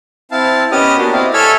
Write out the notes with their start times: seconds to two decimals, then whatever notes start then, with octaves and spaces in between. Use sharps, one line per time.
0.31 C4 E4 F5 A5
0.72 B3 C#4 G4 D#5 D#6 F6
0.97 A#3 D4 F#4 G4
1.12 C4 E4 D5 D#5 F5
1.33 A4 C#5 E5 G#5 E6 F6